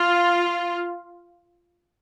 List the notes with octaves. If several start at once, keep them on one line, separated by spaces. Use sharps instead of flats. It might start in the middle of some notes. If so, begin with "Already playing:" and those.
Already playing: F4